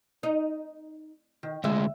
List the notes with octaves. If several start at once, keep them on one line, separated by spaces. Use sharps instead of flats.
D#4
D#3
D2 G#3 E5